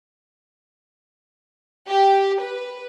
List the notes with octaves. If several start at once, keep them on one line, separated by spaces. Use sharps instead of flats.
G4
B4